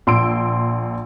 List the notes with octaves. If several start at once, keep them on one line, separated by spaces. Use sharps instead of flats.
A#1 C6 E6 D7